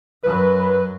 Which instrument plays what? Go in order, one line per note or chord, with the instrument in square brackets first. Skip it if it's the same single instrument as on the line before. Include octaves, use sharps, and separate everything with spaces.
[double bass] F#2 F#3 [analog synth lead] B4